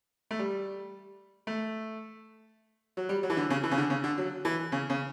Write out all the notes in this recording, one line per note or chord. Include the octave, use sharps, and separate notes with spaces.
A3
G3
A3
F#3
G3
F#3
E3
D3
C#3
E3
C#3
D3
C#3
D3
F#3
E3
C#3
C#3